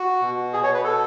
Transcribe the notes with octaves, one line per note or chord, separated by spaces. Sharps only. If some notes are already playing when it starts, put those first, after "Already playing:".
Already playing: F#4
B2
G#4
C#5
B4
A4